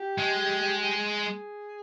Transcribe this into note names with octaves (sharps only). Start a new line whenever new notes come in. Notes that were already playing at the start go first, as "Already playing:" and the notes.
Already playing: G4
G#3
G#4